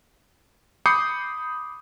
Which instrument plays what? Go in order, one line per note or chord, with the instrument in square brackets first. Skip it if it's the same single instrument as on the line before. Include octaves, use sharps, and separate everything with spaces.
[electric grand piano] B5 D6 D#6 G6 C7 C#7